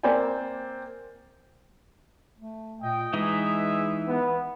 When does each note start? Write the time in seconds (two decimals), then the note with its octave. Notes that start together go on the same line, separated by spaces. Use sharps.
0.03 A#3 C4 C5 D5 G5 G#5
2.39 A3
2.82 A#2 D#5 G5
3.13 E3 G#3 D#4 G#4 B4 E5
4.08 B3